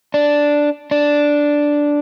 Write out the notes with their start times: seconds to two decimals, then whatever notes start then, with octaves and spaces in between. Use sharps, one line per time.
0.14 D4
0.91 D4